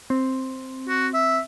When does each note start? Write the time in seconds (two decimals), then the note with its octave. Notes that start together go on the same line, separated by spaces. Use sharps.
0.10 C4
0.88 F#4
1.14 E5